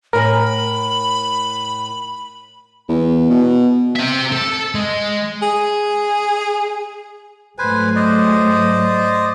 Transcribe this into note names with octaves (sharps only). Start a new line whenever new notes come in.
A2 A#4 G#5 B5
E2
B2
C4 E5
A4
G#3
G#4
G#2 F#3 A3 B4 C5 G#5
C5 D5 D#5